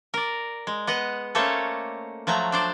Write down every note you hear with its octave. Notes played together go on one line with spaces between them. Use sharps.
A#4 D5
G#3
B3 D#5 F#5
A3 A#3 C#4 A4 C5 C#5
F3 F#3 A3 A#5
D4 C5 D5